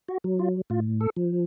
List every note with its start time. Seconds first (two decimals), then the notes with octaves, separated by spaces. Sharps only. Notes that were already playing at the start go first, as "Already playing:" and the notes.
0.08 F#4
0.24 F#3
0.39 F4
0.70 A2 F4
1.01 A4
1.16 F3